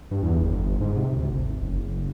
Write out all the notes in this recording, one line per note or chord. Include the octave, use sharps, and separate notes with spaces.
G2
E2
G1
G#2
C3
D2
G#1
F#1